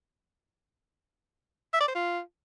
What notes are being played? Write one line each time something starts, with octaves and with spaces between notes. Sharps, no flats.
E5
D5
C5
F4